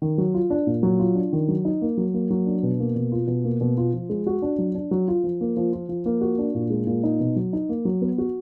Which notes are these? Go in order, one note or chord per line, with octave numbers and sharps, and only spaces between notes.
D#3
F#3
F4
D4
A#2
F#3
F4
D4
D#3
F#3
D#4
A#3
F#3
A#3
F#3
D4
B2
A#3
B2
F4
B2
A#3
B2
F4
F3
G#3
F#4
D4
F#3
D4
F#3
F4
F3
A#3
F3
F4
F3
A#3
F#4
D4
A#2
G#3
A#2
D#4
B2
F#3
D#4
A#3
F#3
B3
F#4